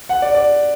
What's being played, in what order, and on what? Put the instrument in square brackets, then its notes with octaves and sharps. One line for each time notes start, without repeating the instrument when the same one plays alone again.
[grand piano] F#5
D5
D5